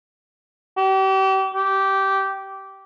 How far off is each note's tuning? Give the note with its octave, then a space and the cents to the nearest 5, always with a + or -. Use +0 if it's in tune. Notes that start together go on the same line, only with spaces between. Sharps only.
G4 -35
G4 -15